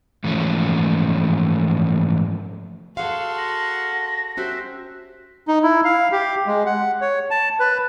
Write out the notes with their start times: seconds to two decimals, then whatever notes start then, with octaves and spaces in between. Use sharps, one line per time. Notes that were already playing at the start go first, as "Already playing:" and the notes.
0.24 G#2 E3 F3 A3 C#4
2.97 F#4 G#4 A4 F5 F#5 C6 F6
3.38 A#6
4.37 C#4 F#4 G4 C5 E5 F#6
5.48 D#4
5.63 E4
5.85 F5
6.12 G4
6.47 G#3
6.66 F#5
7.01 C#5
7.30 A5
7.60 B4